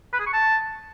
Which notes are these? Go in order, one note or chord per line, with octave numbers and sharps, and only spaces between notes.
B4
G#4
C#6
A5